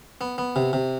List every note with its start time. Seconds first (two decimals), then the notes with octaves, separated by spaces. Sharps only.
0.21 B3
0.38 B3
0.56 C3
0.73 C3